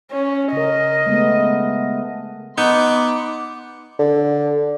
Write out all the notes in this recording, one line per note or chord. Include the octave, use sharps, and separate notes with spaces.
C#4
C#3 A#4 D#5
G#3 A3 B3
B3 D#4 C6 D6
D3